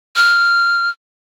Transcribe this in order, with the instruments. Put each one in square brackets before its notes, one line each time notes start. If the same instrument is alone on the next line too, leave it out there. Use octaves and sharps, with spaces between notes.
[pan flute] F6